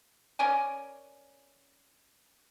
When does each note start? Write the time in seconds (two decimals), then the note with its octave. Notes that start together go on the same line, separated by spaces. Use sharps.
0.39 C#4 A#4 D5 G#5